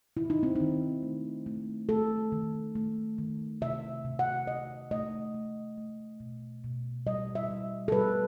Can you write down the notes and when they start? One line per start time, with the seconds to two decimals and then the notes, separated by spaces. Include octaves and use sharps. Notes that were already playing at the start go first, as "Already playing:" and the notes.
0.17 D#3 E4
0.30 D#4
0.43 C4
0.56 D#3 D#4
1.02 A3
1.46 A3
1.89 A3 A4
2.32 D#3
2.75 A3
3.18 D#3
3.61 C3 E5
4.05 C3
4.19 F#5
4.47 C3 D#5
4.91 A3 D#5
5.34 A3
5.78 A3
6.20 B2
6.64 B2
7.06 G3 D#5
7.35 E5
7.50 G3
7.88 A4
7.92 G3 B4